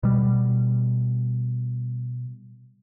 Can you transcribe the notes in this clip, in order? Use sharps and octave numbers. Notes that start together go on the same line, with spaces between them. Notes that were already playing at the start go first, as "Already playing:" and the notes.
B2 G3